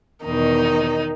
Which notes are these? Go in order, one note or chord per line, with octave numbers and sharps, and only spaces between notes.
E2 B2 D#3 D#4